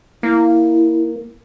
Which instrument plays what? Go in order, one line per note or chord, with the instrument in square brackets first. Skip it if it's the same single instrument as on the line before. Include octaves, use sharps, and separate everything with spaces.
[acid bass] A#3 [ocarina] E4